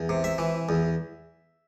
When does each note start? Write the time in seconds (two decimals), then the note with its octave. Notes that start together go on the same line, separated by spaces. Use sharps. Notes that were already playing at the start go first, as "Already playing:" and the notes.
Already playing: E2
0.09 C3
0.24 E5
0.38 E3
0.69 E2